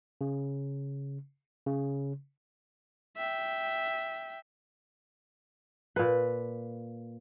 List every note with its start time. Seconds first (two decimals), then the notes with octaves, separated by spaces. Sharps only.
0.21 C#3
1.66 C#3
3.17 E5 G5
5.96 A#2 B4